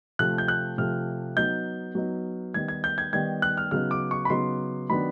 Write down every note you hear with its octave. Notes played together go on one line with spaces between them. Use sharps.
C3 F3 A3 F#6
G6
F#6
C3 F3 A3 F6
F#3 B3 D#4 G6
F#3 B3 D#4
D#3 G3 B3 D#4 G#6
G#6
G6
G#6
D#3 G3 B3 D#4 G#6
F#6
F6
C#3 F#3 B3 D#4 F6
D6
C#6
B5
C#3 F#3 B3 D#4 C6
D#3 F#3 B3 D4 B5